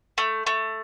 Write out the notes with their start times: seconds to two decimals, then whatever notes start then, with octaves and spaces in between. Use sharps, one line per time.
0.18 A3
0.47 A3